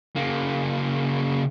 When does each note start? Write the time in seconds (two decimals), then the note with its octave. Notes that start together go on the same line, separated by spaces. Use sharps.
0.16 C#3 A#3